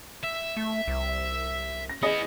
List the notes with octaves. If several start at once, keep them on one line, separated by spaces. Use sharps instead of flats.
E5
A3
C2
A#6
B3 E4 G#4 D#5